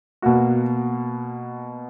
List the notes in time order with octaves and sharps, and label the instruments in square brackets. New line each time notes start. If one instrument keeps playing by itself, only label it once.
[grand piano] B2 A#3 F#4